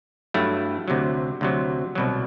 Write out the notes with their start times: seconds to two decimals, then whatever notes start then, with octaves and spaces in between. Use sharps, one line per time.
0.34 G2 F#3 A3 E4
0.88 D2 C3 F#3
1.41 D2 C3 F#3
1.95 C2 B2 F#3